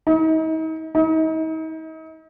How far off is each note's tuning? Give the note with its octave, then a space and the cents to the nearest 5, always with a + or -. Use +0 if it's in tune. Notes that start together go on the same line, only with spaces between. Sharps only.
D#4 +40
D#4 +40